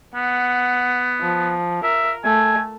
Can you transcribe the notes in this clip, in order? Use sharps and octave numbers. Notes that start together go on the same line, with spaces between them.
B3 F#5
F3
A#4 E5
A3 G#5